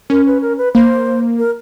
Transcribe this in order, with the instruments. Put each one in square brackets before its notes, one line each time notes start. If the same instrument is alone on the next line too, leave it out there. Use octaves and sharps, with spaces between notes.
[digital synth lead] C#4 [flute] A#4
[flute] B4
A#4
B4
[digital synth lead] A#3 [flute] C5
[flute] A#4